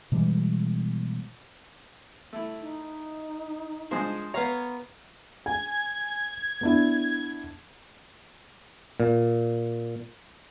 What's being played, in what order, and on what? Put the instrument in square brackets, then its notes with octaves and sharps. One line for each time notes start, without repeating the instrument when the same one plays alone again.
[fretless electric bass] B2 E3 G3 G#3
[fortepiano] A3 E4
[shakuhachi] D#4
[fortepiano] F3 G#3 D4 [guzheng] C5
[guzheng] B3 F5 A#5 [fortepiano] C#5
[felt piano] G#5 [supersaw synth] G#6
[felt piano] B3 D4 E4
[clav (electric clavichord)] A#2